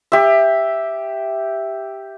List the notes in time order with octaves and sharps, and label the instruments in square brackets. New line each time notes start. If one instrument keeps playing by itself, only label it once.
[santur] G4 E5